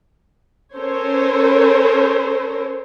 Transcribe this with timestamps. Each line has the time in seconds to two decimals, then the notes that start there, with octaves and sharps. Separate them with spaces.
0.76 C#4 A4 A#4 C5 C#5